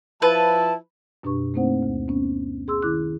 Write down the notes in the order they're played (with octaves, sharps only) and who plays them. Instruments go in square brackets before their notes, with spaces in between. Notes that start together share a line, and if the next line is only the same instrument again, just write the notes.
[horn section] F3 E4 A5 [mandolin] B4
[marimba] F#2 B2 D4 G4 B4 C#6
A3 A#3 C4 D#4 C5 F#5
D2
B3 C#4
G#4 C6 E6
D#3 E4 D6 F#6